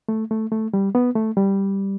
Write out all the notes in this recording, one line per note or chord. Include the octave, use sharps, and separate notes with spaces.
A3
A3
A3
G3
B3
A3
G3